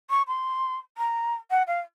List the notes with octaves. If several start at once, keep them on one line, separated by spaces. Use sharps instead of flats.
C#6
C6
A#5
F#5
F5